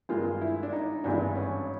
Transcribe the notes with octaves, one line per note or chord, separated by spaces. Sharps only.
G2 D#3 G#3 F4
E4
D4
D#4
G#1 G2 E3 G#3 D4
C#4